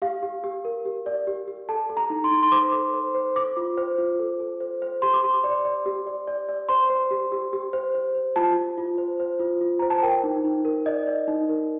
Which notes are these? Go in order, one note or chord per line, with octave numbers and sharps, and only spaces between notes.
G4 F5
G4
G4
A#4
G4
D5
G4
G4
A4 A5
A4
A#5
D#4
C6
D#4
C6
C5 D6
A4
C5
C5
C5 D6
F4
C5
F4
A4
A4
C5
C5
G4 C6
D6
G4 C6
D5
D5
G4
D5
D5
D5
C5 C6
C5
G4
G4
G4
C5
C5
C5
F4 A5
F4
F4
C5
C5
F4
F4
C5 A#5
A5
A#4 G5
D#4
D#4
A#4
D5 D#5
D5
D#4
A#4